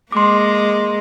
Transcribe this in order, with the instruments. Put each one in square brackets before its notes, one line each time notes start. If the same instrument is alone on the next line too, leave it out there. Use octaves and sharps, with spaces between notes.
[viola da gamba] G#3 A#3 [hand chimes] C6 D6